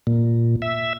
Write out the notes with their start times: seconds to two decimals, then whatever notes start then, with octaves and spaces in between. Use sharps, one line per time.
0.07 A#2
0.62 E5